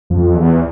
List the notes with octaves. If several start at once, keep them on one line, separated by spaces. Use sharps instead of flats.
F2
E2